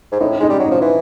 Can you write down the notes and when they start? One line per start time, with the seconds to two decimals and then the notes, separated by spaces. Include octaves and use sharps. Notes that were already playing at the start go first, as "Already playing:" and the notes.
0.12 G#2
0.20 A2 D#4
0.40 G#3 D#4
0.49 G3
0.59 F#3
0.66 D#4
0.71 F3
0.81 E3